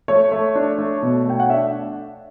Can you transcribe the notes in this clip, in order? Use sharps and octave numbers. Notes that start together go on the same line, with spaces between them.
A3 C#5
A3
D4
A3
B2
A3 G5
F#5
D4 E5